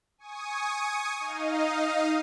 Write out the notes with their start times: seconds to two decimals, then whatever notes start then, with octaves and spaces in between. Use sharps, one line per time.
0.18 G#5 C#6 D#6
1.20 D#4 D#5 F5